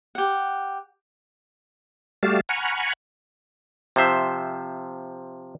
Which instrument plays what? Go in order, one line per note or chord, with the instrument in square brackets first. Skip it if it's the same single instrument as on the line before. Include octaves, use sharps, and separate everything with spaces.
[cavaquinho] G4 F#5
[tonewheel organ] G3 A3 F#4 G4 F5 A5
F#5 G#5 A#5 B5 C#6 F6
[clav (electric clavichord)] C3 F3 C5 E5